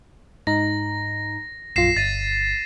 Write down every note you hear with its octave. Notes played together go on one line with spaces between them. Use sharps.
G#2 D#4 A#5 A#6
A#1 F#2 F4 A#6 C7 E7
G1 A6 D#7